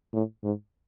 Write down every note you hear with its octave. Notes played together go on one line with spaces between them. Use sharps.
A2
G#2